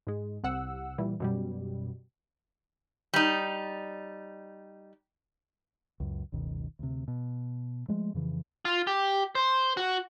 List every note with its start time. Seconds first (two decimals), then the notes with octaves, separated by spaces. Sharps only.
0.07 G#2 G#3
0.44 C2 C3 F#5 E6
0.98 A#2 E3 G3
1.20 F#2 B2 G3
3.14 G3 D#4
6.00 C#2 F#2
6.32 F#1 C#2 B2 D#3
6.79 D2 C3
7.08 B2
7.88 F3 G#3 A3
8.14 F2 C#3 E3 F3
8.65 F4
8.87 G4
9.35 C5
9.77 F#4